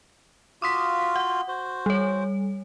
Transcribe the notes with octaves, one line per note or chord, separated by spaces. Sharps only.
F4 F#4 F5 D6 D#6 B6
F#5
F#4 C5
G3 C#5